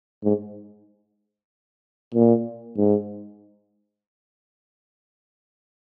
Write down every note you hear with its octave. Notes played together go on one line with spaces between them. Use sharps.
G#2
A#2
G#2